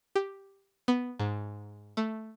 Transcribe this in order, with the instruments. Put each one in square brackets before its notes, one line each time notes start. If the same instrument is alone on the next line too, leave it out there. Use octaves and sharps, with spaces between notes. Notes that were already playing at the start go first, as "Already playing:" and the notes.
[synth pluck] G4
B3
G#2
A3